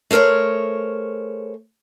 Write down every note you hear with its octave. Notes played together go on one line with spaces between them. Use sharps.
A3 G#4 A#4 C5 C#5